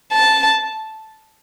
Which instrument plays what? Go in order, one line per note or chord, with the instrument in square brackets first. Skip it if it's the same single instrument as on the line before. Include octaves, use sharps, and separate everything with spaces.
[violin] A5